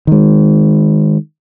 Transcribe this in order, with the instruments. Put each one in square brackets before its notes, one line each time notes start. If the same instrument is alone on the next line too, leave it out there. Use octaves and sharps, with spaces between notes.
[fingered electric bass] D#3 G#3